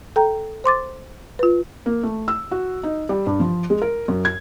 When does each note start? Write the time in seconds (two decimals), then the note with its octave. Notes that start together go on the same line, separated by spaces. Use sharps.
0.16 A4 G5 A#5
0.64 C5 C6 D6 A6
1.39 F4 B4
1.86 A#3
2.03 A3
2.28 E6
2.51 F#4
2.83 D#4
3.09 G3
3.26 G2
3.40 F3
3.70 G#3
3.82 A#4
4.08 F#2
4.25 G#6